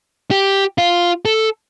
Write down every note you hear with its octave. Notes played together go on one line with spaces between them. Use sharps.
G4
F4
A4